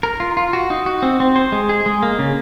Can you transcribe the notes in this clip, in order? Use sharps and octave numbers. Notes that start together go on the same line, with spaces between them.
A#4
F4
F4
F#4
D#4
F#4
C4
C4
C5
G#3
G#4
G#3
A#3
C#3